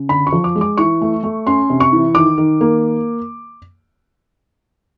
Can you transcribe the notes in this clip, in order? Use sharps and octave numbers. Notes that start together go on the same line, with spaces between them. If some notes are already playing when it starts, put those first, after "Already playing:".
Already playing: C#3
D3 B5
C#6
F3
D6
G#3
D6
E3 C#6
A3
A3
C#4 C6
C3
C#6
E3
D#3 D6
D#3
A#3